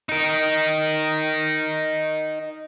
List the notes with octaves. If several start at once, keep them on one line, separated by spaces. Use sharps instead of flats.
D#4 A#4